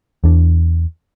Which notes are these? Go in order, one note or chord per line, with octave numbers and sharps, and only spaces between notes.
E2 D4